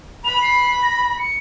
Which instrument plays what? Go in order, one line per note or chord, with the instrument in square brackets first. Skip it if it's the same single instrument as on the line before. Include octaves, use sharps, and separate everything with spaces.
[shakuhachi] B5 [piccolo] F7
[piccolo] C7
A#6
C#7